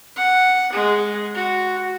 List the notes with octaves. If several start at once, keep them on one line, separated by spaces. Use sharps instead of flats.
F#5
G#3
F#4